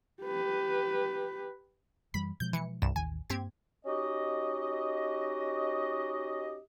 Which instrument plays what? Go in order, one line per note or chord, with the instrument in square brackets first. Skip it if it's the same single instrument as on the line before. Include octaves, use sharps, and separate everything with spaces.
[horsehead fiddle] G4 B4
[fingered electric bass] F#2 E3 G3 [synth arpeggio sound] B5
[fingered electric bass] B2 F3 G#3 [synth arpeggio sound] G6
[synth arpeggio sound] E3 C#7
C2 G2 E7
[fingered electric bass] A1 D#2 D#3 [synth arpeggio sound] G#5
[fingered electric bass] G2 A#3 [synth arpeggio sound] C4 G4 G#6
[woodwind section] C#4 D#4 F#4 G4 D#5